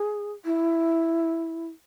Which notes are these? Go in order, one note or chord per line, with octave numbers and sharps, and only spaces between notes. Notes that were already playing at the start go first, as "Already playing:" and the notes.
Already playing: G#4
E4